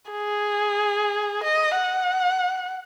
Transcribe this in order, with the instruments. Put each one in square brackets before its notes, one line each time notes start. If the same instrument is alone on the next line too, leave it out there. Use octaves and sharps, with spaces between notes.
[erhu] G#4
D#5
F#5